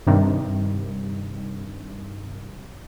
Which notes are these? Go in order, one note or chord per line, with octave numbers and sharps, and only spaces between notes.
G2 C3 D#3